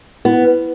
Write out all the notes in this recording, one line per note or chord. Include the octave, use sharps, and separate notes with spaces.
B3 E4
B4